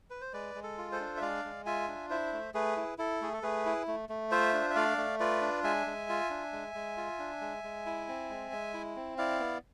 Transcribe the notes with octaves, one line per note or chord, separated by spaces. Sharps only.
B4
C5
G#3 B4 D5
G#3
A4
F4
A4 C5
D4
E5
G#3 D5 F5
G#3
F4 E5 G#5
D4
E4 C5 E5
A3
A3 G#4 B4
E4
E4 A4
A3 G#4
A4
A3 G#4 B4
E4
A3
A3
F4 C5 E5
D4
E5
A3 D5 F5
A3
F4 B4 D5
D4
G#3 E5 G#5
G#3
F4
D4
G#3
G#3
F4
D4
G#3
G#3
E4
C4
G#3
G#3
E4
C4
E4 D5 F5
B3